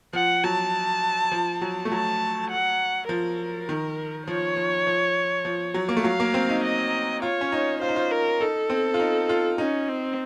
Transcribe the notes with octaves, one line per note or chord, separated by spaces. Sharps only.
F3 F#5
F#3 A5
F3
F#3
A3
F#3 A5
F#5
F3 A#4
D#3
F3 C#5
F3
F3
F3
F#3
A#3
A3
F#3 F5
A#3
C4
D#4
D#5
F4 C#5
C#4
D#4
F4 C5
D#4
F4
A#4
D#4 A4
C4
F4
D#4
F4
C#4 D#4
C4